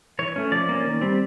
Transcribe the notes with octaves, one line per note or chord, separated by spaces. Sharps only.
E3 C#5
A3 C#4
F3 D5
A#3 C#4
D#3
G3 C4